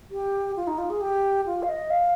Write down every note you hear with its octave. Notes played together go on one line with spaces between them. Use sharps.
G4
F4
D#4
F4
G#4
G4
F4
F5
D#5
F5